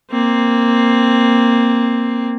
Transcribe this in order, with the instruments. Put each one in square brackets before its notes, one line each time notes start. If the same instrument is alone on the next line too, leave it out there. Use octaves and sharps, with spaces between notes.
[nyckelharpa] A#3 C4